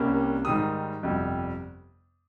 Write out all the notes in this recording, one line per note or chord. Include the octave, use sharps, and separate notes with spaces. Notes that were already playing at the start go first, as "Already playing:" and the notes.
Already playing: C2 C3 G3 A#3 C#4
G#2 D#3 G3 D#6
G1 F2 C3 G3